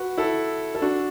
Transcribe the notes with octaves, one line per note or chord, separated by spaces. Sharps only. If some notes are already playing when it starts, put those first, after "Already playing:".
Already playing: F#4 B4
E4 A4
A4
D4 F#4